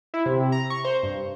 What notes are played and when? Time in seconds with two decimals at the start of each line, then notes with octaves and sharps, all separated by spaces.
0.14 E4
0.26 C3
0.52 A#5
0.70 C#6
0.85 C5
1.03 G2